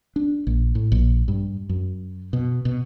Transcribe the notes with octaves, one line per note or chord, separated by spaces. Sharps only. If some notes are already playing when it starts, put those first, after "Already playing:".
D4
A#1
A2
A#1
G2
F#2
B2
B2